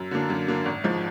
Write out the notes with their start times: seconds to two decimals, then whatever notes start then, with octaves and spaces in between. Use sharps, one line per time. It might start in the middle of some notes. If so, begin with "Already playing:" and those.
Already playing: F#2
0.11 D3 F#3 A#3 D4
0.30 F#2
0.48 D3 F#3 A#3 D4
0.66 G#1
0.84 G#2 F3